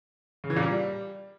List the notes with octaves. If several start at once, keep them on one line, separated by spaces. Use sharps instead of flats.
C#3
E3
A#2
G3